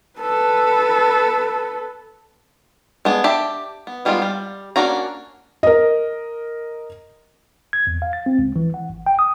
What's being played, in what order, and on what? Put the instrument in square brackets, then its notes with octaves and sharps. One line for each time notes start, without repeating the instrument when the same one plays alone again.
[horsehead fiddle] A4 B4
[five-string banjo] G#3 B3 D4 G#4
D4 G4 E5
B3
D#3 G3 G#3 B3 F4
G3
A#3 C#4 D4 F#4 A#5
[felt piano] A#4 D#5
[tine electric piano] G#6
E2
F5
A6
C4
C#2
E3
F#5
G#1
G5
D#6